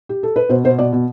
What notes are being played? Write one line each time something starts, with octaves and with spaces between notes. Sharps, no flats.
G4
A4
B4
B2 C5
B2 C5
B2 D5
B2